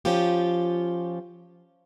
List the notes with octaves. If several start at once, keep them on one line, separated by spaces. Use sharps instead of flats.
F3 C#4 F4 G4